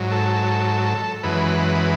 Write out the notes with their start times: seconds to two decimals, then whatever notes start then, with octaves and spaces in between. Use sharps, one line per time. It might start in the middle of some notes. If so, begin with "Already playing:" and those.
Already playing: G#2 F#3
0.11 A4
1.23 F#2 E3 G#3 B4